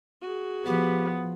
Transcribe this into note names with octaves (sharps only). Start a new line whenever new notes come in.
F#4 G#4
F3 B3 G4